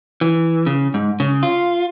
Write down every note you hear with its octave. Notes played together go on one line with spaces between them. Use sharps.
E3
C#3
G#2
C#3
F4